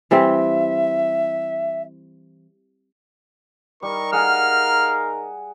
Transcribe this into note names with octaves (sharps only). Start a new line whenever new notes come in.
E3 G3 C4 E5
G3 D#4 A#4 C#6
G#4 F5 F#5 F6